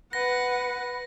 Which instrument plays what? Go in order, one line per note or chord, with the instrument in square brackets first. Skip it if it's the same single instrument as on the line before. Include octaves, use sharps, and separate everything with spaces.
[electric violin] B4 F#5 [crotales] A#6